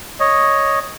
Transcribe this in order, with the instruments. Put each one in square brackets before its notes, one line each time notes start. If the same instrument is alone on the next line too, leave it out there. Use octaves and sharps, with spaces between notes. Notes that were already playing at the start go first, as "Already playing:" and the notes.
[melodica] C#5 D#5